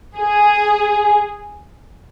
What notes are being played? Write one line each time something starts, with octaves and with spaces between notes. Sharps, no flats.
G#4